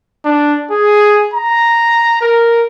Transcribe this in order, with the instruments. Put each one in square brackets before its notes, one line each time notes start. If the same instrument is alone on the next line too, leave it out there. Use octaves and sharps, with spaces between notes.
[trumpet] D4
G#4
A#5
A#4